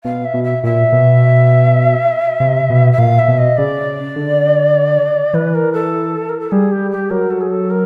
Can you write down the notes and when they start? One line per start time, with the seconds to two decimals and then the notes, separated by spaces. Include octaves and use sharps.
0.04 B2 F5
0.25 E5
0.34 B2
0.44 E5
0.64 A#2 E5
0.92 B2
2.40 C3
2.70 B2
2.92 E5
2.98 A#2 F5
3.19 E5
3.28 B2
3.38 D#5
3.57 C#3 D5
4.16 D3
5.34 E3 B4
5.54 A#4
5.73 A4
6.29 A#4
6.40 A4
6.51 G3 G#4
6.72 G4
6.91 G4
7.10 F#3 A#4
7.30 A4
7.41 G#4
7.50 A4
7.70 A#4